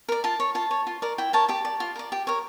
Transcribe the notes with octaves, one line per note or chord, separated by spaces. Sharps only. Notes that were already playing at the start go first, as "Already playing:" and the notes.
A#4 D5
F4 A5
C#5
F4 A5
C#5
F4
A#4 D5
E4 G5
A#4 C#5 A5
G4 A5
D5
F4
A#4 D5
G4
A#4 C#5